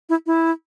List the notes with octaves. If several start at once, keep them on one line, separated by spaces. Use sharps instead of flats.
E4
E4